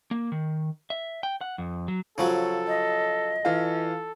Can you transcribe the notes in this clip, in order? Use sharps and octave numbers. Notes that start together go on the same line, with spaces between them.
A#3
D#3
E5
G5
F#5
F2
F#3
C#3 F3 F#3 A4
D#5
E3 F4 A4